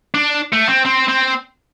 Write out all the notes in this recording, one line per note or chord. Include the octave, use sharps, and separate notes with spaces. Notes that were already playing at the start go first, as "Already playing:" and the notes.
D4
A3
C4
C4
C4